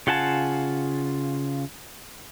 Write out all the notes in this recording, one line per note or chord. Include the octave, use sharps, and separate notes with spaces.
C#3 F4 F#5 G#5 A5